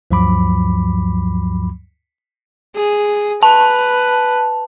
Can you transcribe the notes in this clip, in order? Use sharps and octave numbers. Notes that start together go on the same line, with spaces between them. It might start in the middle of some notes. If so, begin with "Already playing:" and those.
D2 G2 F3 F#3 B5 D6
G#4
B4 A5